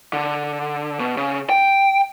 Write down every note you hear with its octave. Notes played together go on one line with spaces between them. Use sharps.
D3
B2
C#3
G5